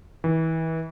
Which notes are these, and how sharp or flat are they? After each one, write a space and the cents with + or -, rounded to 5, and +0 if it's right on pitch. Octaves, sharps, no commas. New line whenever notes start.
E3 -30